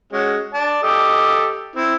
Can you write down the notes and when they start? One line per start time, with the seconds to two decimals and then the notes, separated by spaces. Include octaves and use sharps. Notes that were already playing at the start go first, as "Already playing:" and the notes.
0.13 G#3 C#4 F#4
0.54 D5 A5
0.83 G4 A4 D#5
1.76 C4 E4